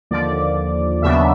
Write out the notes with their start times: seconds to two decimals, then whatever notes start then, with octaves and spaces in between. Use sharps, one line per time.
0.11 D#2 D3 F3 D5
1.02 D#2 C#3 F#3 B3 D4 E5